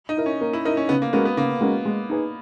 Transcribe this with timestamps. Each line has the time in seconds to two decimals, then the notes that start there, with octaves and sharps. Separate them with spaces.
0.09 D#4
0.17 E4 A#4
0.26 C#4
0.41 A#3
0.53 E4
0.65 D#4 E4 A#4
0.77 C#4
0.89 C#3 B3
1.02 A#3
1.13 G#3 B3 C#4 F#4 A#4
1.25 B3
1.37 C#3 A#3
1.61 G#3 C#4 F#4 A#4
1.85 G#3
2.09 D#4 G#4 B4